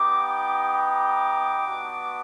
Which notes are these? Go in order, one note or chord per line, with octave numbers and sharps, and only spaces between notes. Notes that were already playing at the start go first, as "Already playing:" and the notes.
Already playing: B3 D#4 G4 D6
D6
D6
B3 D4 F#4